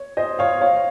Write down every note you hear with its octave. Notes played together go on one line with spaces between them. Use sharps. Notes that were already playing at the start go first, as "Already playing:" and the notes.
Already playing: C#5
C5 D#5
C#5 F5
C#5 F5